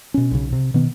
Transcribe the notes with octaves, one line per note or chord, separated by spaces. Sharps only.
B2 C#4
B1 C#3
C3
B2 D#3 B3